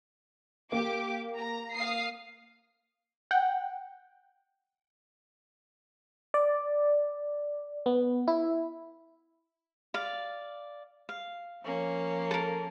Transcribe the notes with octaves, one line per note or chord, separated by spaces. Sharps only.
A#3 G4 D6
A#5
F5 D#6 C7
F#5 G5
D5
B3
E4
D5 F5
F5
F3 A#3 C#4
A4 A#4